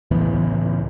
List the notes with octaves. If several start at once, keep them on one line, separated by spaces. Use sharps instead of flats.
C#2 A2 E3 B3